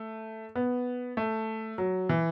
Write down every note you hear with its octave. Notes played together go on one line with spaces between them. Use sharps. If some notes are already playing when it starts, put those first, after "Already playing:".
Already playing: A3
B3
A3
F#3
E3